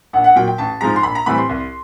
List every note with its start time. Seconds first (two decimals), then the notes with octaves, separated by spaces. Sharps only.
0.13 A#1 F#5
0.24 F#5
0.36 A#2 F#3 G5
0.48 G5
0.58 A1 A5
0.81 G#2 F3 G#3 A#5
0.96 C6
1.03 A#1 B5
1.15 A#5
1.26 A2 E3 G3 C4 B5
1.38 C6
1.49 C2